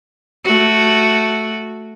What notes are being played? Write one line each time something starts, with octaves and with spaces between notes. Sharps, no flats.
A3 F#4